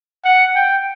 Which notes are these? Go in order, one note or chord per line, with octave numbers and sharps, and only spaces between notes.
F#5
G5